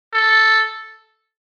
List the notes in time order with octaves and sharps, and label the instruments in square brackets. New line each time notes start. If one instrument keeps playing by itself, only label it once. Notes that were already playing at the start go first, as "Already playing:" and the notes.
[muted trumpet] A4